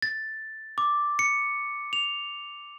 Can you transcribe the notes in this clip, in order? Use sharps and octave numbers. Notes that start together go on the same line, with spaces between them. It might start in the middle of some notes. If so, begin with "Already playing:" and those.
A6
D6
C#7
F7